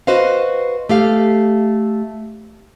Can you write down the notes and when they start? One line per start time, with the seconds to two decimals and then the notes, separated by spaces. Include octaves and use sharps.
0.07 F#4 B4 C5 D#5 F5
0.89 A3 G4 F5